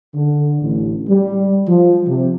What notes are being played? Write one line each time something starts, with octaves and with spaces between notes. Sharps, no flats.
D3
A1
G3
F3
C3